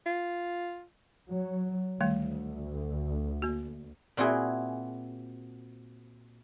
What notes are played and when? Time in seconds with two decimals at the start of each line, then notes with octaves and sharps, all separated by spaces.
0.06 F4
1.28 F#3
2.01 D2 D#3 G3 A3
3.42 A#3 F#4
4.17 A#2 C4 E4 F#4 G#4